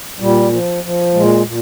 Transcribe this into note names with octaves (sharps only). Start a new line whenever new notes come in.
A#2 G3
F3
F3
A#2 G#3
A#2